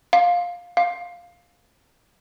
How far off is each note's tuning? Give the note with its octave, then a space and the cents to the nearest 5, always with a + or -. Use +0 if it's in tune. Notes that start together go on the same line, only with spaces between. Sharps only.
F5 +10
F5 +5